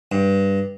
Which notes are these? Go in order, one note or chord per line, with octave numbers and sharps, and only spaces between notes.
G2